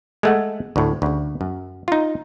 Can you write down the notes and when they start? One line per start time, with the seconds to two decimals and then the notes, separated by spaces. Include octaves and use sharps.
0.23 G#3 A3 F#5
0.76 D2 A2
1.02 D2 C#3
1.41 F#2
1.88 D#4 F4